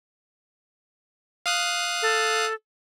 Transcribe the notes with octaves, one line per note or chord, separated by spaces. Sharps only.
F5 D#6 F#6
A4